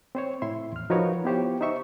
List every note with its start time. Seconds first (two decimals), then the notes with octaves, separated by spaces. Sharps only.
0.15 C4 C5 C#5
0.42 A2 E4 E5 C6
0.72 E2 F6
0.90 F3 D#4 F#4 A#4 B4 C#5
1.24 B3 E4 F4 G4 C5 C#5
1.61 D#4 C5 E5 C#6